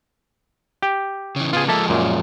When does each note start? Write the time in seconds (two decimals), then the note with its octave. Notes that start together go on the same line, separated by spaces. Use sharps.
0.82 G4
1.36 C#3 E3
1.53 C#3 B3 F4 G#4
1.68 F3 G#3 A#3 A4 E5
1.89 F#2 A#2